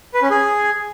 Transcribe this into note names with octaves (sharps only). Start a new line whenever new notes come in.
B4
C#4
G#4